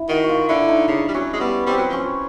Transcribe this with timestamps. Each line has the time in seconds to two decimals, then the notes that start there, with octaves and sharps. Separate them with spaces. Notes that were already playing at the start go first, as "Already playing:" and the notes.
Already playing: E4
0.09 D#3 F#4
0.24 F#4
0.29 F4
0.49 D3 E4
0.68 D#4
0.88 C#3 D4
1.08 G3
1.14 F#3 C#4
1.33 G#3
1.40 G3 B3
1.67 G3 C4
1.78 F#3
1.89 F3 C#4
2.01 F#3